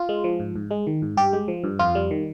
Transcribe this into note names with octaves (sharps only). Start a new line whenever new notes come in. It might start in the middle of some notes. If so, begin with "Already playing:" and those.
Already playing: F4
G#3
F3
G#2
G#2
G#3
D#3
G#2
G2 G4
G#3
F3
G2
F2 F4
G3
D#3